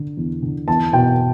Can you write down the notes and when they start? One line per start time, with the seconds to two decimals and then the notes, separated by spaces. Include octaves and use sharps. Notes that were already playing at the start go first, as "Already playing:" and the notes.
Already playing: D3
0.17 E2
0.43 D3
0.68 E2 A5
0.93 B2 G5